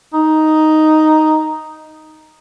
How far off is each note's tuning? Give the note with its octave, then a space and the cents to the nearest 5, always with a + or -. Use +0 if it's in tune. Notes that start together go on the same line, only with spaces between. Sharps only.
D#4 +0